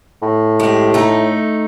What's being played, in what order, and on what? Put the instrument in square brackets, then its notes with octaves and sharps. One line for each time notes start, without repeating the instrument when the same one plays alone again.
[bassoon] A2
[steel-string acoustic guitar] G#3 G4
A3 D#4